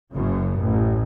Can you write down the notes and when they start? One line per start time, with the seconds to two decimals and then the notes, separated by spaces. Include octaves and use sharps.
0.13 F#1 F#2 C#3
0.60 A1